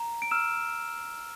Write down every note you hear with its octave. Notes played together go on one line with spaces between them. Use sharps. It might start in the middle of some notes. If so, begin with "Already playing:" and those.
Already playing: A#5
D7
E6 F6 E7